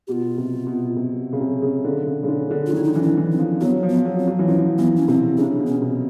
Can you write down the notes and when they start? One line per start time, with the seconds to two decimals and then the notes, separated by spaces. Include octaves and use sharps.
0.07 B2 F4 G4
0.38 C3
0.67 B2
0.96 C3
1.33 C#3
1.40 C3
1.62 C#3
1.84 D3
2.07 C#3
2.23 C#3
2.28 D3
2.51 D3
2.67 F4
2.73 D#3 E4
2.84 D#4
2.93 E3 D4
3.03 C#4
3.17 E3
3.32 C4
3.39 F3
3.61 F#3 B3
3.83 F3
3.90 B3
4.05 F#3
4.19 C4
4.27 F#3
4.39 E3
4.49 F3 C#4
4.78 E3 B3
4.96 C#4
5.08 C3 C4
5.38 C#3 D4
5.59 B2
5.67 C#4
5.82 C3